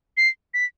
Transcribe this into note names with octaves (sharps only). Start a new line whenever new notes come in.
C7
B6